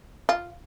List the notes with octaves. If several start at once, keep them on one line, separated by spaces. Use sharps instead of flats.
F4